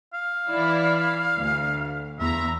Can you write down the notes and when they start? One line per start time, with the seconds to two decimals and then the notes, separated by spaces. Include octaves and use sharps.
0.14 F5
0.49 E3 E4 D5
1.38 D2
2.19 E2 E5 A#5